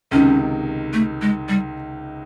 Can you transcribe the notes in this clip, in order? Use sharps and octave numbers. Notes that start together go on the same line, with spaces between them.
C#2 C3 D#3 C#4
A3
G#3
G3